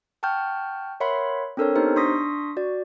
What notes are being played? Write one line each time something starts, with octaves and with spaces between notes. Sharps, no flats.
F#5 G5 A5 C#6 F6 G6
A#4 C#5 E5 F#5 B5 C6
C4 D4 A4 A#4 C5 C#5
B3 D#4 G4 C5
D4 C6 C#6 D#6 A#6 B6
F#4 D5